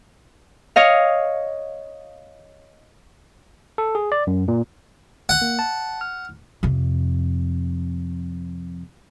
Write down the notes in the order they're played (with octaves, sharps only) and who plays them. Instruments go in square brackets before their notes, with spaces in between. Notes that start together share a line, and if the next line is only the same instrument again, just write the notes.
[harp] C#5 D#5 F5
[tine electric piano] A4
G#4
D5
F#2
A#2
[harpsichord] F#5
[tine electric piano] A#3
A5
F6
[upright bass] F2 C3